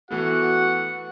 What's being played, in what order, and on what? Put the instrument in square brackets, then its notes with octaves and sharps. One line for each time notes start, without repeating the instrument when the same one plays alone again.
[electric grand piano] E3 A3 B3 [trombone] F#4 [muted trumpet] F#5